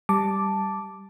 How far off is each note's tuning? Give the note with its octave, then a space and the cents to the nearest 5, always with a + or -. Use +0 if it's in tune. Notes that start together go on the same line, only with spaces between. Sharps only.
G3 +0 A5 +0 D6 +0